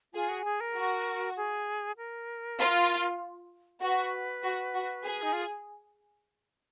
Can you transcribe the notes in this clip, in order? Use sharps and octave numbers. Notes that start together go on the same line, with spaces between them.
F4 G#4
F#4
G#4
A#4
F#4
G#4
A#4
F4
F#4 B4
F#4
F#4
G#4
D#4
F4